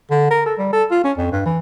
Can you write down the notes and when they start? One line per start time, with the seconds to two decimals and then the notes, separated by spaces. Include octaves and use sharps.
0.11 D3
0.30 A#4
0.46 A4
0.59 G3
0.73 A4
0.91 F4
1.04 C#4
1.18 F2
1.32 G2
1.45 E3